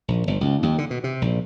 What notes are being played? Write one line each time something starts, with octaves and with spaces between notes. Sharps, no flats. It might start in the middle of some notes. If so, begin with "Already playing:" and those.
A#1
G1
C#2
D#2
D3
B2
C3
A#1